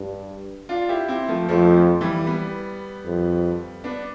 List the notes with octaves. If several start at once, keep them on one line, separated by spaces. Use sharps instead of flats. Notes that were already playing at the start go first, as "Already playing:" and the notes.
Already playing: G2
D4 F4
E4 G4
C4 E4
F3 A3
F2 F3 A3
E3 G3
G3 B3
F2
B3 D4